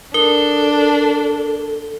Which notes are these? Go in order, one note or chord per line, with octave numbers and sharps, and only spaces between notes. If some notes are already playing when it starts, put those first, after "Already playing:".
D4 A4 A#4 G7